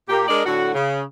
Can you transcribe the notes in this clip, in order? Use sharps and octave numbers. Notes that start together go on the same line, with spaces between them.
A#2 A#3 G4
G#3 D4 A#4 D5 D#5
A2 D3 F#4
C#3